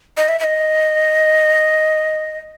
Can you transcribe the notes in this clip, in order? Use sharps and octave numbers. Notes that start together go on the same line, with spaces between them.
D#5
E5
E5
D#5